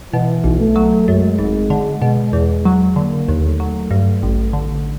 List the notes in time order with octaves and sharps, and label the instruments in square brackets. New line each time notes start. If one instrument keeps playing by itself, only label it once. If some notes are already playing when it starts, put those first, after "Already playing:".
[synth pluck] B2 [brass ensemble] E3
[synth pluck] B1
[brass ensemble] A3
[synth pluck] F#3
[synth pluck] F#2 [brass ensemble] G#3
[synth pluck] G#1
D3
B2
E2
F#3
[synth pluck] D3 [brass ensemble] A#3
[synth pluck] D#2
[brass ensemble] A3
[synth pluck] F#3
G2
A1
D3